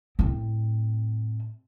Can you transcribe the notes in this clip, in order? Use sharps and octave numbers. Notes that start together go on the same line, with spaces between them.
A2 C4